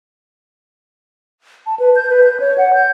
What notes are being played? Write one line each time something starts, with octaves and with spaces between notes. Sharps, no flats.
A5
B4
G6
B4
G6
C#5
F#5
G6